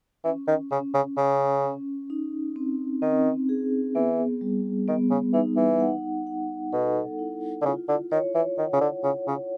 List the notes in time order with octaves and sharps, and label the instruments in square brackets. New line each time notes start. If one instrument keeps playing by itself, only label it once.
[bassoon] E3 [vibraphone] C#4
[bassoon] D#3
[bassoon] C#3 [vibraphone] C#4
[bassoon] C#3
[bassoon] C#3 [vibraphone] C#4
[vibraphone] C#4
D#4
C4
[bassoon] D#3 [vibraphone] C4
[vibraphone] G#4
[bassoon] E3 [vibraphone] B3
[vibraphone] G3
[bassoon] D#3 [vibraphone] B3
[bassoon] C#3
[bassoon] E3 [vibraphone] D#4
[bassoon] E3
[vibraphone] F#5
F#5
[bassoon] B2 [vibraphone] A4
[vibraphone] E4
[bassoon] D3
[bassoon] C#3 [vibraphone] F4
[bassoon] D3
[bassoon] D#3 [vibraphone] C#5
[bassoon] E3
[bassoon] D#3 [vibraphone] F#5
[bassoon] C#3
D3
[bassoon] C#3 [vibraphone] C#5
[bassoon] C#3